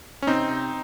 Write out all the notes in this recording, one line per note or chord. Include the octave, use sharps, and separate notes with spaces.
C#4
C3 C4 D#4
C3